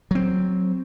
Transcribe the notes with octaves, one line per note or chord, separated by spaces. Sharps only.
F#3 C4